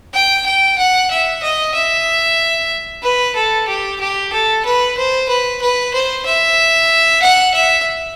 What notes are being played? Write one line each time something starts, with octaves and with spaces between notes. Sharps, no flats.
G5
G5
F#5
E5
D#5
E5
B4
A4
G4
G4
A4
B4
C5
B4
B4
C5
E5
F#5
E5